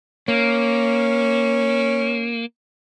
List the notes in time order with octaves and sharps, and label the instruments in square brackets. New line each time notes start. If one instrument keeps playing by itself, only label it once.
[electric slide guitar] A#3 [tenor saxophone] C#4